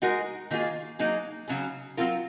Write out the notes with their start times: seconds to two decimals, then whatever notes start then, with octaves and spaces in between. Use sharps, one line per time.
0.02 G#3 D#4 F#4 A#4
0.51 D#3 A#3 F4 G#4
0.99 F#3 A#3 D#4 G#4
1.48 C#3 F#3 C#4 G#4
1.97 F#3 C4 F4 A#4